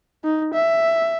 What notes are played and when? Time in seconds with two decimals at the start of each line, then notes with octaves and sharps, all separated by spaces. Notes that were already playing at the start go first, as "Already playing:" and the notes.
0.24 D#4
0.54 E5